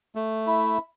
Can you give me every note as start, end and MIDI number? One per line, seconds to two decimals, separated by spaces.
0.15 0.78 57
0.47 0.79 64